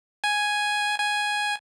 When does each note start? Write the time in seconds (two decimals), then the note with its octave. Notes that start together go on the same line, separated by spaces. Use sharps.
0.24 G#5
0.98 G#5